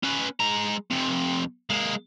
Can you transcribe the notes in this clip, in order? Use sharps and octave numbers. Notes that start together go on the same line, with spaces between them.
C#4 B4
G#3 A#5
F2 C3
G#3 A#3